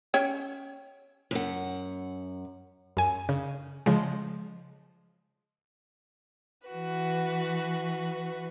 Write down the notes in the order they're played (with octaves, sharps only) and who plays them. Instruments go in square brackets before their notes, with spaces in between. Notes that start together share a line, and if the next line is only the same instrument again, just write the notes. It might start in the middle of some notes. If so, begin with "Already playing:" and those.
[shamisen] C#4 C#5 G5
[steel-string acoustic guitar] F#2 F#5
[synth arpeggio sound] F#2 G#5
C#3
C#3 F3 G#3
[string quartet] E3 F#4 B4